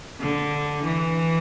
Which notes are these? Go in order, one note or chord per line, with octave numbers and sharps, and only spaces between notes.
D3
E3